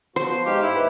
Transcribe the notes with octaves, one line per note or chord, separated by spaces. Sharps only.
F3 B3 F#4 C5
G#3 D#4 G4 F5
G#2 E4
D#2 B4